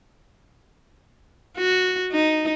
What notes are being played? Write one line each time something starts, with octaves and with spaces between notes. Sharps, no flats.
F#4
D#4